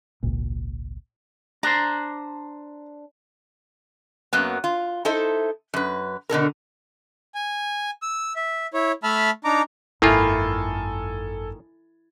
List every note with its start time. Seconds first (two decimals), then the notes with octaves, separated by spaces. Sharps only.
0.23 G#1 C#2 A#2
1.63 D4 C5 A#5
4.33 F#2 F#3 A#3 B3
4.64 F4
5.05 D#4 E4 A4 C5 E5
5.74 F#2 B4
6.29 B2 D3 A4 A#4
7.35 G#5
8.02 E6
8.36 E5
8.74 E4 C#5
9.03 A3 E5 A5 B5 F6
9.44 D4 D#4 A#5 D6
10.02 G#1 F#2 D#3 A#3 E4 F4 A4 G#5